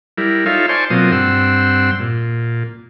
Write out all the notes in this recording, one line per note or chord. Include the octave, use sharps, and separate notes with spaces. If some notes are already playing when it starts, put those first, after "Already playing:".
G3 E4 A#4
D#4 F4 A4 C#5 E5 F5
C5 D5 G#5 A5 C6 C#6
B2 F#3 A#3 C4 F4 D#6
G2 C4 F#5 C6 E6
A#2